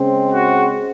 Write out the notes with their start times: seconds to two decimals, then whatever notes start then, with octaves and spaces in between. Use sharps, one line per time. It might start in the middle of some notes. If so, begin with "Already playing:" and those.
Already playing: C#3 G#3 C4
0.30 F#4